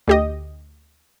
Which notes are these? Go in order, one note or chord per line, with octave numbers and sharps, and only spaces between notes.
D2 G4 D#5